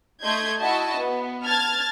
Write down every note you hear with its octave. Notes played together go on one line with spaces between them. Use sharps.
A3 D#5 C6 G6 G#6
E4 F#4 D#5 E5 A5
B3
A5 F6 G#6 A6